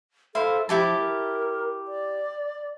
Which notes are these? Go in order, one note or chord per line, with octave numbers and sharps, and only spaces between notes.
E4 A4 C5 F5
F3 E4 G4 A5
A#4
D5